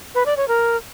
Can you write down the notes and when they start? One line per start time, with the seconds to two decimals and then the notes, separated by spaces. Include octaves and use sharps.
0.15 B4
0.26 D5
0.37 C#5
0.48 A#4